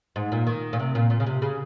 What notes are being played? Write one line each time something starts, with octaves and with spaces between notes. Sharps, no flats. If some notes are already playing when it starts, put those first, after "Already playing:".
G#2
A#2
D#3
A#2
C3
A#2
A#2
C#3
C3
C#3